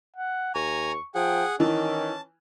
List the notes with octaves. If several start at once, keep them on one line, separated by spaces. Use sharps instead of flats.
F#5
D#2 G#5 A#5 C#6
F3 G#4 F#5 G5
D#3 E3 C#4 A5